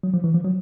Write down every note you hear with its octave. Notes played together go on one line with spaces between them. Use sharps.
F#3
F3
E3
F3
F#3